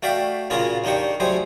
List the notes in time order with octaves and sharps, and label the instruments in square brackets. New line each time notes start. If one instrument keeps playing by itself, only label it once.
[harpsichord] A3 F#4 D5 E5 F5 G5
A#2 C#3 F4 F#4 G#4 A#4
D#2 A#3 D4 D#4 G4 C#6
F#3 G3 A3 G#4 C5